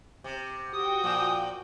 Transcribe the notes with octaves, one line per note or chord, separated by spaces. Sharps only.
C3
F#4 G4 G5 D#6
A#2 F3